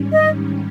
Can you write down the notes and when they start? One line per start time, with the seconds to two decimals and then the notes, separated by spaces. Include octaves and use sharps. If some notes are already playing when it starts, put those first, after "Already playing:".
Already playing: G#2 D#3 G3 C#4
0.13 D#5